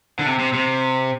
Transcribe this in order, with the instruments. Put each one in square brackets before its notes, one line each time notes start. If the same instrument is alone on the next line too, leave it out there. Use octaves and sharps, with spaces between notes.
[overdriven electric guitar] D3
C3
C3
C3